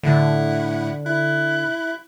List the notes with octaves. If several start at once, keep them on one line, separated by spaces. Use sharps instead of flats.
A2 D3 E4 F#5
E4 F#6